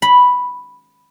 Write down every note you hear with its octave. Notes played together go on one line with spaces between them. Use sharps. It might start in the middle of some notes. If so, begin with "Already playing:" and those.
B5